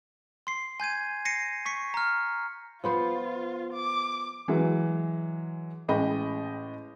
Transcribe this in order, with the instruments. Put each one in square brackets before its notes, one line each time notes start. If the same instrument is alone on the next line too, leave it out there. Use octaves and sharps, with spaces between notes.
[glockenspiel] C6 C7
G#5 G6 G#6 D#7
A#6 C7 C#7 D#7
C#6 B6 C#7
A#5 F6
[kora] F3 B3 C5 [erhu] F4
[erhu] D6
[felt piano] E3 F#3 G#3
A1 G#3 D#5 G5 B5